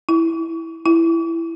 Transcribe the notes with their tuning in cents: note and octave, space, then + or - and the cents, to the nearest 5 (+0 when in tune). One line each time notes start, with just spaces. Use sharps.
E4 -5
E4 +10